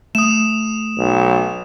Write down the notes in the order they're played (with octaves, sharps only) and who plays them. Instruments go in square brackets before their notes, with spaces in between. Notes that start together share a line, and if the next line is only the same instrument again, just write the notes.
[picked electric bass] A3 [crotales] D#6 E7
[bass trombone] B1